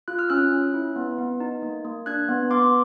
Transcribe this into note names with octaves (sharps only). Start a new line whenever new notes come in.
F4 F#6
F6
C#4 E6 F#6
C#4
E4
B3
B3
D#4
A#3
A#3
D4 F#6 G#6
B3
B3 C6 D6